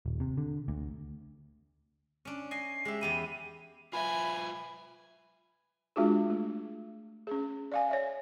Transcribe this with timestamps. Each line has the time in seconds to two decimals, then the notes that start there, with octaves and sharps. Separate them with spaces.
0.06 D#1
0.20 C3
0.38 D3
0.68 D2
2.25 C#4 D4
2.51 D#5 G#5 C7
2.85 G#3 G4 E5
3.01 E2 G4 B5 D#7
3.93 F4 B4 E5 G#5 B5
5.96 G#3 D4 F4 F#4 G#4
6.30 A3
7.27 C#4 G#4
7.72 D5 F5 G#5
7.89 C#5 D5 E5